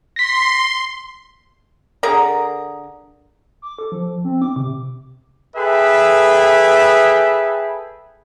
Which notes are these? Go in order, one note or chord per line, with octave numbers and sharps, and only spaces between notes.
C6 A#6 B6
D3 G#4 A#4 A#5
D6
A4
F3
C4
D6
C3
G#4 A4 B4 E5 G5 B5